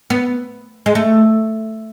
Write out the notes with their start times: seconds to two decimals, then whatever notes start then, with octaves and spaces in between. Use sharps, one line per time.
0.10 B3
0.86 G#3
0.95 A3